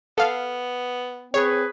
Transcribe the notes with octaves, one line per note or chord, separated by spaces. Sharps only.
B3 A4 F5
C4 G#4 B4 C#5